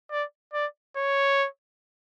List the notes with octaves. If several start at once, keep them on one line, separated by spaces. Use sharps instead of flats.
D5
D5
C#5